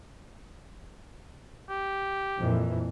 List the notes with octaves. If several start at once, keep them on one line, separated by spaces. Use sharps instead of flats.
G4
F2 A#2 E3